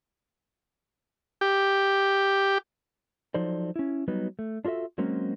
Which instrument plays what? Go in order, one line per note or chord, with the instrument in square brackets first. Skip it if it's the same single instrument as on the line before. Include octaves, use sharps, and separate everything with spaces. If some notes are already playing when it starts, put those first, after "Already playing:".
[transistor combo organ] G4
[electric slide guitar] F3 F#3 D#4 A4 C5 D5
C#4 E4
F#3 G3 B3 D#4 B4
A3
D4 F4 F#4 A4 E5
F#3 G#3 A#3 C4 C#4 F#4